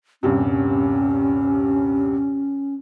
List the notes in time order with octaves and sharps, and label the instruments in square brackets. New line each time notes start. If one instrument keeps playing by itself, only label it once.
[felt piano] D#1 G2 C3 [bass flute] C#4